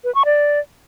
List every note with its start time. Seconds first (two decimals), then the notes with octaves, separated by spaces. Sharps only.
0.04 B4
0.15 C#6
0.25 D5